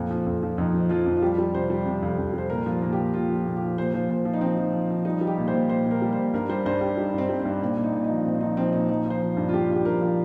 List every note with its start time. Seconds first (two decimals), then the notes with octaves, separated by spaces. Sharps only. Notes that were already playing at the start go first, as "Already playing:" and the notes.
Already playing: F2 A#2 C4
0.11 F3
0.27 F2
0.43 F3
0.58 F2 D#4
0.74 F3
0.90 F3 F4
1.06 F2
1.17 F4
1.22 G3 G4
1.38 G3
1.54 C3 C5
1.70 G3
1.85 C3
2.03 F2
2.18 F2
2.34 G3 C5
2.50 A#2 A#4
2.66 F3
2.71 F4
2.82 A#2 A#4
2.92 G4
2.98 A#2
3.14 A#2 F4
3.29 F3
3.35 F4
3.46 A#2
3.57 G4
3.62 F3
3.78 A#2 C5
3.94 F3 C5
4.09 A#2 C5
4.25 F3
4.34 D#4
4.41 F3 C4
4.58 F3
4.73 F3
4.90 F3
5.05 G3 D#4
5.21 G3
5.27 G4
5.38 A#2
5.48 C5
5.54 A#2
5.70 A#2 C5
5.86 A#2
5.91 A#4
6.02 G3
6.13 C5
6.18 A#2
6.34 G2 A#4
6.49 G3 C5
6.66 G2 C5
6.81 G2 G4
6.97 G3 D#4
7.14 G2 C4
7.29 G3
7.40 C4
7.45 G2
7.61 A#2 C4
7.77 A#2
7.83 D#4
7.93 A#2
8.04 D#4
8.09 F3
8.25 A#2 C4
8.35 C4
8.41 F3 D#4
8.57 F3 C4
8.73 A#2 D#4
8.89 F3 D#4
9.06 F3 C5
9.22 F3
9.37 G2
9.49 F4
9.53 G2 G4
9.69 G2
9.76 G4
9.85 F3 A#4
10.01 F3